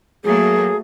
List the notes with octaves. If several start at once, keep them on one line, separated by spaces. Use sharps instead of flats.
F#3 A3 A#3 G#4